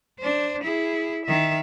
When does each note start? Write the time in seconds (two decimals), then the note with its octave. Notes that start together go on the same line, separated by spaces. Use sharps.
0.19 D4 C5
0.63 E4 G#4
1.25 D#3 E5